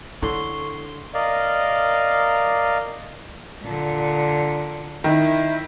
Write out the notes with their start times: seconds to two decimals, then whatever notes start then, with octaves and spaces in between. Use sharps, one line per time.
0.22 D3 E4 C#5 C6
1.14 A#4 D5 D#5 F5
3.62 A#2 D3
5.04 D#3 E4